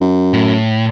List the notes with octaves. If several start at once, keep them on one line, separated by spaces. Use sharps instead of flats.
F#2
A2